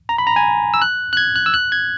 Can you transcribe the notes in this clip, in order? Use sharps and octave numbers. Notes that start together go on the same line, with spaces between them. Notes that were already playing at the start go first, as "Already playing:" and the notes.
A#5
B5
A#5
G#5
E6
F#6
F#6
G#6
F#6
E6
F#6
G#6